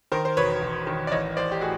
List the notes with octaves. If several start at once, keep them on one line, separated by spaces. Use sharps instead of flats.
D#3 A#4 C5
C5
E1 B4 C#5
E1
D#3
D5
A1 C#5 D#5
A1 C5 D5
G4
A2 F#4 G#4